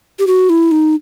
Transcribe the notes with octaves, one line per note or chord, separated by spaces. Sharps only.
G4
F#4
E4
D#4